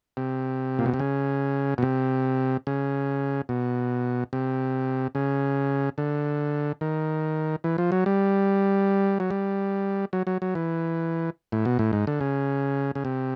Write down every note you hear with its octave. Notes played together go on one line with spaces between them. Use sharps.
C3
A#2
B2
C3
C#3
B2
C3
C#3
B2
C3
C#3
D3
D#3
E3
F3
F#3
G3
F#3
G3
F#3
F#3
F#3
E3
A2
B2
A2
G#2
D3
C#3
C#3
C3